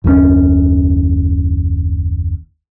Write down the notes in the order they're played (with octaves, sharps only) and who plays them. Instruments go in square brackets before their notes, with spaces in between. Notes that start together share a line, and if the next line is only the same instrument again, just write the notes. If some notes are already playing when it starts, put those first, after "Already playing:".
[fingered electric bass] F#1 D#2 A2 C#4